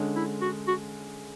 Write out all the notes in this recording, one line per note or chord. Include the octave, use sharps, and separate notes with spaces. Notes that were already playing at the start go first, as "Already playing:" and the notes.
Already playing: D3 G#3 C#4
E4
F#4
F#4